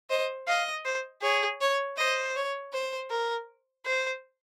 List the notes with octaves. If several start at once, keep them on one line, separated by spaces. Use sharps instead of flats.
C5 D#5
D#5 F5
C5
G#4 C#5
C#5
C5 D#5
C#5
C5
A#4
C5